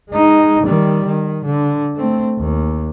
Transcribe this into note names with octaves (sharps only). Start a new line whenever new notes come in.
G#3 D#4
D#3 G3
D#3
D3
A3 C4
D#2